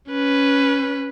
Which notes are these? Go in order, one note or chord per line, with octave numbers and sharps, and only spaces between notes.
C#4 B4